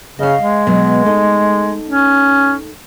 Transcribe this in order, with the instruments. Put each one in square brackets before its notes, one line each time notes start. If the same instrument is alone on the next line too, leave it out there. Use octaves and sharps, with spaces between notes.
[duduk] C#3 [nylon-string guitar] D#5 F5
[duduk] G#3
[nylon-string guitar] B2 F#3 B3
A3 D#4
[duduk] C#4